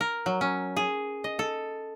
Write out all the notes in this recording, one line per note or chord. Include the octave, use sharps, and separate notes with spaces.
A#4
F#3
C#4
G#4
D#5
A4